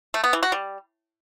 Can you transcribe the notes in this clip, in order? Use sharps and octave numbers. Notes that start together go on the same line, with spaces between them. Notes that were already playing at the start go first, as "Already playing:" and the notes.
A3
B3
E3
F#4
G3